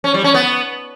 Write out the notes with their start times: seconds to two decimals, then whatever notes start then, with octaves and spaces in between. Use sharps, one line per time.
0.04 C#4
0.14 G3
0.24 C#4
0.34 B3